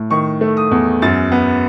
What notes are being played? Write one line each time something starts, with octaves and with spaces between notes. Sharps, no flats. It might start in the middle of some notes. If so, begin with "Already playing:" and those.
Already playing: A2
D#3 C#6
A3
D#6
E2
F#2 A6
B3